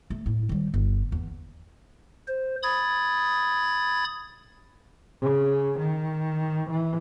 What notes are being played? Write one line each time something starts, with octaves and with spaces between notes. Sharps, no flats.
A3
A2 E4
D#3 G3
G1
E2
C5
B5 D#6 G#6 A6
C#3
D#3
E3